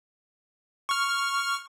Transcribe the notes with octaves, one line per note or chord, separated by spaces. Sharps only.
C#6 F6